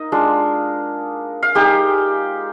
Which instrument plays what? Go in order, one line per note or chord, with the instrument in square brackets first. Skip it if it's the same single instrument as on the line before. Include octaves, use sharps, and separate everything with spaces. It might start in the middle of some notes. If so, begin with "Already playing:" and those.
Already playing: [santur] A#3 D#4 D#5
G#3 D4 F4
F5
G#3 D#4 G4 G5